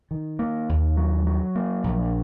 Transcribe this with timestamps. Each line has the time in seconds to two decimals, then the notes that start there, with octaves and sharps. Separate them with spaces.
0.11 D#3
0.39 A#3
0.69 D#2
0.97 F#3
1.27 F#3
1.55 A#3
1.84 A#1